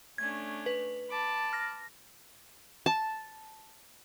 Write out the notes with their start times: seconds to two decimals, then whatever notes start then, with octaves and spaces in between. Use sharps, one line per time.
0.18 A3 C#4 D4 G#6
0.66 B4
1.08 A5 B5 D6
1.53 F6 A#6
2.86 A5